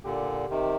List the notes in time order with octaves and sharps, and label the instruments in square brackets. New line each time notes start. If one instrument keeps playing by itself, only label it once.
[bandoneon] A#2 D3 [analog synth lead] G4
[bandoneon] C3 D#3